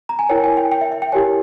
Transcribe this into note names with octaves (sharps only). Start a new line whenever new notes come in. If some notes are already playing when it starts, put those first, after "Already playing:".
A#5
G#5
E4 A#4 C#5 G5
G#5
G5
G5
E5
E5
G5
E4 G4 A#4 C#5 G#5